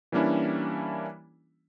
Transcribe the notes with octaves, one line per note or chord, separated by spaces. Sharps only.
E3 G3 A#3 C#4 D4 E4